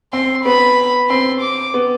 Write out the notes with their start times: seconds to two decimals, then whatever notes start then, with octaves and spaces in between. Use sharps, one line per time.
0.13 C4 C6
0.45 B3 B5
1.10 C4 C6
1.42 D6
1.74 B3